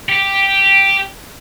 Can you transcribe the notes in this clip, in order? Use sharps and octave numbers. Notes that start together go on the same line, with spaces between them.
G4